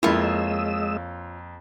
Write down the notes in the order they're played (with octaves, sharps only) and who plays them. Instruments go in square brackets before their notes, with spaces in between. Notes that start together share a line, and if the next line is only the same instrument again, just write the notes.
[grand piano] F2 A#3 [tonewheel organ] G#3 D#5 E6 [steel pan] E4 [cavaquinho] F4 C#5